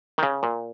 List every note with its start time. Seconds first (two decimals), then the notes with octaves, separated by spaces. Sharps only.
0.18 D#3
0.23 C#3
0.43 A#2